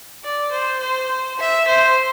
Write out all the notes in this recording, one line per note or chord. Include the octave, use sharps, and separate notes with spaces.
D5
C5
C5
E5
C5